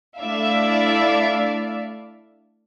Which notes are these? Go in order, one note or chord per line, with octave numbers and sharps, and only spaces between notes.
A3 D4 E4 D5 E5 F5